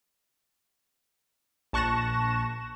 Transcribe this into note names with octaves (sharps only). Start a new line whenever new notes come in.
A#1 A5 C#6 F#6 A#6 E7